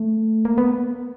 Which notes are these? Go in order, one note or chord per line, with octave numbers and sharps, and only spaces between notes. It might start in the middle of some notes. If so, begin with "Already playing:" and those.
Already playing: A3
A#3
B3